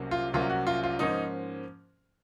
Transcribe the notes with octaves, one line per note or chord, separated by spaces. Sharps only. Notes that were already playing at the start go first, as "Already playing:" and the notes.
Already playing: C2 C3 F#3 A#3 C#4
F4
C2 C3 F#3 A#3 C#4 F4
F#4
F4
F4
G#2 F3 A#3 C#4 D#4